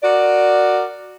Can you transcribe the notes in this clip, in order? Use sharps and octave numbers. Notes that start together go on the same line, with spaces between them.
F#4 A#4 D5